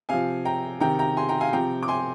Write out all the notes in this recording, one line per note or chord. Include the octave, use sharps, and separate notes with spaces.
C3 F3 F5 G#5
G5 A#5
C3 D#3 G5 A#5
G5 A#5
G#5 C6
G5 A#5
F5 G#5
C3 F3 G5 A#5
D6
G#5 C6